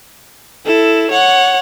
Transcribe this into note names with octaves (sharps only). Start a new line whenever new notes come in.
E4 A4
C#5 F#5